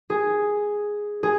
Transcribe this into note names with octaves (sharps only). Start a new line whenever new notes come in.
G#4
G#4